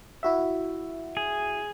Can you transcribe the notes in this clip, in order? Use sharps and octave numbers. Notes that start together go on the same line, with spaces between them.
E4 F#4 E5
G#4